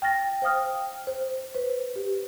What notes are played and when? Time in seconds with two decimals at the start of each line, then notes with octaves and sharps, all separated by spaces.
0.02 G5 F6 A6 A#6
0.42 C5 F5 G5 D#6 F6
1.07 C5
1.54 B4 C5
1.96 G4